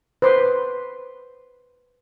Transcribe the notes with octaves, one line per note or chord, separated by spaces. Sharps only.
B4 C5 C6 D6